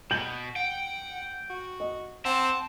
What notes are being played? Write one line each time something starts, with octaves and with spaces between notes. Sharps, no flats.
B2 G6 F#7
F#5 G5
F#4
D#5
C4 F#5 A5